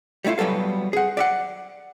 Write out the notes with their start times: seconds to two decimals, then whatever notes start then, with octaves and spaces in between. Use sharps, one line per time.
0.24 G3 A3 C#4 E4 F4
0.38 F#3 G3 B3 A4 F5
0.93 G#4 F#5
1.17 D5 E5 F#5